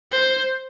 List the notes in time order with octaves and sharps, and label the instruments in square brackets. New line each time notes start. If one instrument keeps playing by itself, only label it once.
[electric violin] C5